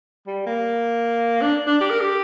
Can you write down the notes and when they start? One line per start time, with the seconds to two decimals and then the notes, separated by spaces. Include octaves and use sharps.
0.27 G3
0.46 A#3
1.42 D4
1.67 D4
1.81 G4
1.90 A#4
2.01 G4